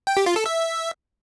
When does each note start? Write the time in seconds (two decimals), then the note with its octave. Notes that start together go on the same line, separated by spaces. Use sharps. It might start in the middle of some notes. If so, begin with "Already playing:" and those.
0.07 G5
0.17 G4
0.26 F4
0.36 A4
0.46 E5